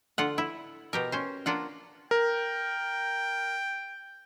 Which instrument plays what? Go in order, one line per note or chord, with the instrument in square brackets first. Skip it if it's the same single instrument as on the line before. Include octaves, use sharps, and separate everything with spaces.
[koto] D3 F4 F#5
E4
B2 G4 A#4
C#4 C5
A#3 D4 F4 F#5
[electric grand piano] A#4 [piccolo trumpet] G5